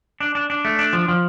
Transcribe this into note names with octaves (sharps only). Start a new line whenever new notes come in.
D4
D4
D4
A3
D4
F3
F3